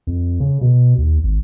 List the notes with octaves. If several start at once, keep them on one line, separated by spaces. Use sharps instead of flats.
F2
C#3
B2
D#2
G#1